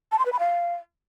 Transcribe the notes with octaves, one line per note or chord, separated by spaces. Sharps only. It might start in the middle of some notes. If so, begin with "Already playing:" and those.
A5
C6
B4
B5
F5